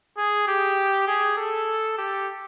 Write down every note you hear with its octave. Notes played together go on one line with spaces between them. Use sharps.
G#4
G4
G#4
A4
G4